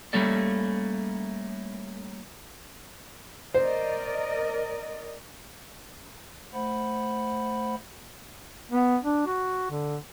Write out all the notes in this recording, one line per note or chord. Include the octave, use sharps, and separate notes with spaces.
G3 A3 A#3 C#4 A4 D5
A#4 C5 D5 D#5
A3 C5 F#5 B5
B3
D4
F#4
D3